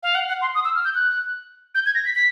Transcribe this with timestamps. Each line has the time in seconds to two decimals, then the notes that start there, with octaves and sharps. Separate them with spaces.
0.03 F5
0.15 F#5
0.28 F#5
0.41 C6
0.55 D#6
0.64 E6
0.75 F6
0.84 G6
0.94 F#6
1.75 G6
1.86 G#6
1.95 A#6
2.05 B6
2.15 B6